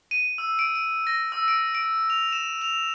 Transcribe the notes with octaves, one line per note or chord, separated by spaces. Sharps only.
D#7
E6
D7
D7
A#6
E6
D7
D7
F7
E7
F7